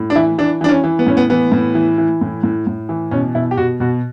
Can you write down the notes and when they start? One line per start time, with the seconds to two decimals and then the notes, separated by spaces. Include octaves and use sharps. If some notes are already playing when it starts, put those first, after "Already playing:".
Already playing: A2
0.10 D4
0.15 E3 E4
0.38 E3 D4
0.61 E3 D4
0.69 C#4
0.84 E3
0.99 B3
1.07 A2 C#4
1.17 B3
1.30 E3 B3
1.52 A2
1.75 E3
1.98 E3
2.21 A2
2.43 A2
2.67 A2
2.89 E3
3.11 B2 C#4
3.35 B2 E4
3.51 G4
3.57 B2 F#4
3.80 B2 F#4